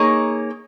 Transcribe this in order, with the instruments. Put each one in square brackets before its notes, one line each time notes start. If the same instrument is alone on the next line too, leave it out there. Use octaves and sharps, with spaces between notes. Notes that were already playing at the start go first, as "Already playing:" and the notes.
Already playing: [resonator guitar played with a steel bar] A#3 D#4 G#4 C#5